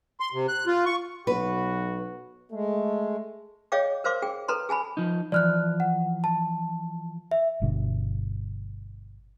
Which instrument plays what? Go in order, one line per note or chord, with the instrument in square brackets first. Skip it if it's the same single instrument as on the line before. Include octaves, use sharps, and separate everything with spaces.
[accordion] C6
C3
F#6
F4
C#6
[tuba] B1 [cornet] F#4 [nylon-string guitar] B4
[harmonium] G#3 [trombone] A3
[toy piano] G#4 C#5 D#5 F5 G5 D6
A#4 C5 F5 C6 D6
G#4 G5
A4 B4 A#5 C6
G#4 G#5 A5 B5
[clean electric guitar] F3 D#4
[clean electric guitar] E3 F3 [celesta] D5 F6 F#6
[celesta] F#5
A5
E5
[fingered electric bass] G1 G2 B2